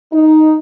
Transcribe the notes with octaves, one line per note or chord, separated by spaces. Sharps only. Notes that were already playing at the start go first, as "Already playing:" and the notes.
D#4